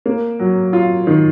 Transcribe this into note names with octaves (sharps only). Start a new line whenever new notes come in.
A#3
F#3
F4
D#3